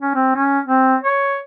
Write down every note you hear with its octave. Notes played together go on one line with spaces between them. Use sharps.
C#4
C4
C#4
C4
C#5